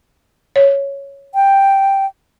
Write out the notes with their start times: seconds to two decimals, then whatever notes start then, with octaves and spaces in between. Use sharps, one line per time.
0.56 C#5
1.35 G5